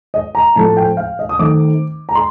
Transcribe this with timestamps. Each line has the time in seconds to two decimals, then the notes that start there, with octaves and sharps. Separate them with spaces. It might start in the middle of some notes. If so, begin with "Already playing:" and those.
0.14 D#5
0.35 A#5
0.55 A2 F3 A3 C4 A5
0.77 G5
0.97 F5
1.19 D#5
1.29 D#6
1.39 D#3 A3 C4 D6
2.09 A#5
2.15 C6